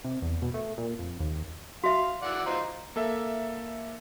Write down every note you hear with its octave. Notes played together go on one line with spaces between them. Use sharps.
C3
E2
B2
A3
A#2
F2
D#2
F#4 E5 F5
E3 D5 F#5
D#4 F4 C5
A#3 A4 E5